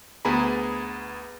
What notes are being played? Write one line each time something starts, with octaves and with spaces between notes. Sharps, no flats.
D2 B3 G#4 A#5 B5